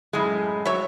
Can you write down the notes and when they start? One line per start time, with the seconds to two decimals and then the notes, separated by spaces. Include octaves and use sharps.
0.13 F#2 A2 G#3
0.65 F#3 C#5 E5